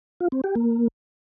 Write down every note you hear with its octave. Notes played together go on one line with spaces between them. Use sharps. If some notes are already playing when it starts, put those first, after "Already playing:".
F4
C4
G4
A#3